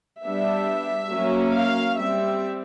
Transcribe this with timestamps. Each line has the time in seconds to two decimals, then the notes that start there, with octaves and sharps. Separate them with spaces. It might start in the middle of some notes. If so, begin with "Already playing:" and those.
0.22 G3 B3 D4 E5
1.10 F#3 A#3 C#4
1.53 F5
1.98 G3 C4 E5